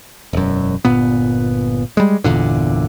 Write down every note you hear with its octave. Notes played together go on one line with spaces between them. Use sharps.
E1 F#2
G1 A#2 B3
G3 G#3
G1 E2 A#2 D3